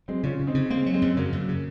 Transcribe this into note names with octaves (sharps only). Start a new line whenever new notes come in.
F#3 G#3 C4
C#3 C#4 F4
C#3
C4 D#4
C#3
G#3 A#3 C4
F#3
G#3 C4
F#2
C#3 F#3 A#3
F#2
C#3